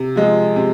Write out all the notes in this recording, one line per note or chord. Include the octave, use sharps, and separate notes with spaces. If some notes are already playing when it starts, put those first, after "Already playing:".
Already playing: C3
F3 G#3
C3